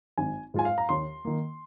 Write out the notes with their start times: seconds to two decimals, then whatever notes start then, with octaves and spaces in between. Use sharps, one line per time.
0.18 G#1 G#5
0.54 G#2 G#3 F4 G#5
0.65 F5
0.78 A#5
0.89 D#2 C6
1.25 D#3 A#3